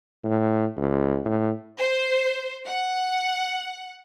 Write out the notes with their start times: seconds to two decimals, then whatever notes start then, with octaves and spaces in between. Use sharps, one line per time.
0.24 A2
0.77 C#2
1.25 A2
1.79 C5
2.67 F#5